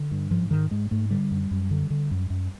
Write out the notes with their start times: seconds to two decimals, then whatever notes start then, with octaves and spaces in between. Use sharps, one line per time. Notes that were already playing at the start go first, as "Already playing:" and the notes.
Already playing: D3
0.11 G2
0.31 G#2 F3
0.51 G#2 D#3
0.71 G#2 G#3
0.91 G#2 A3
1.11 D3 G3
1.31 F#2
1.51 F#2
1.71 D3
1.90 D3
2.11 F#2
2.30 F#2